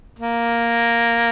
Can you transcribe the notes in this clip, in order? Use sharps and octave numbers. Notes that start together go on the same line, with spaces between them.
A#3